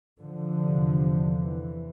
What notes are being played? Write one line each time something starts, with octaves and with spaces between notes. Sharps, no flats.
D3 F3
E2 C3
E3